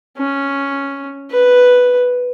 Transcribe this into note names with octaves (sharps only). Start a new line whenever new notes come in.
C#4
B4